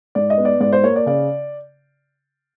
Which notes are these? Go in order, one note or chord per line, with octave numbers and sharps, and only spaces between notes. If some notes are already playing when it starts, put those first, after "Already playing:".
G#2 D5
D#5
B3
D5
G#2 D5
C5
A#3 C#5
D5
C#3 D5